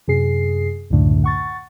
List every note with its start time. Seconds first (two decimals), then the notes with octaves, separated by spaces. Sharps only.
0.08 F#2 C3 G#4 C7
0.90 C#2 F#2 A2 D3 A3
1.24 F#5 C#6 A6